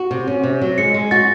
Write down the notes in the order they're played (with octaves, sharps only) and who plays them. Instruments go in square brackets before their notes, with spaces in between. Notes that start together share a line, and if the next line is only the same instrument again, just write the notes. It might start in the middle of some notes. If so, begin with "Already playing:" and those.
Already playing: [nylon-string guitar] F#4
C3
C#4
C3
F#3
[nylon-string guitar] G#3 [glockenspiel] C#7
[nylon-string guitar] G#3
[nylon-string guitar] F#4 [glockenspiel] A6